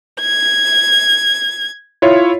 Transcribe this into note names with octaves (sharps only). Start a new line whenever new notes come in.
G#6
E4 F4 C#5